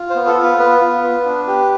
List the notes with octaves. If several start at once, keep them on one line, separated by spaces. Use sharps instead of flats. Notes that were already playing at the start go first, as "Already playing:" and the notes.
Already playing: F4
C5
B3
A4
F4
B4
B3 B4
F4
B3
D4
G4